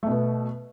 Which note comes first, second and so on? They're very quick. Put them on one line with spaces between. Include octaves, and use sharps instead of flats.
A3 B2 B3